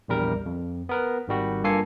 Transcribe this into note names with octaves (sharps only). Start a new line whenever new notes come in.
A#1 E2 G3 A#4
F2
B3 A#4 B4
G#1 D#3 G3 F#4
G2 A#3 F4 A4 G#5 C7